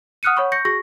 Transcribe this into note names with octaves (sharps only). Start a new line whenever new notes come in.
F#5 D#6 F6 F#6 C#7 D#7
C#5 F#5 B5 C#6
C#6 G6 A#6 C#7
F#4 G#4 C#6 A#6